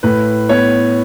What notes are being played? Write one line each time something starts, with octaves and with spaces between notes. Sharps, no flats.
A2 B4
B3 C#5